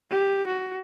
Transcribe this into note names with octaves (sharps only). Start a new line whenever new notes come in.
G4
F#4